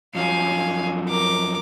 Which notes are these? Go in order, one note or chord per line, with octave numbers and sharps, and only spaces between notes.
F#2 F3 F#3 F5 G#5
A#4 D6